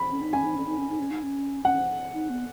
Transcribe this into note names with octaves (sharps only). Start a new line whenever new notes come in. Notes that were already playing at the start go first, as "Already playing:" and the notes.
Already playing: B5
C#4
D#4
C#4 G#5
D#4
C#4
D#4
C#4
D#4
C#4
D#4
C#4
C#4 F#5
D#4
B3